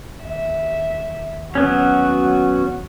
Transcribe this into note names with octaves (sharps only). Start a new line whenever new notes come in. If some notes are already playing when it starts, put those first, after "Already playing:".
D#2 E5
F#3 B3 C#4 F#4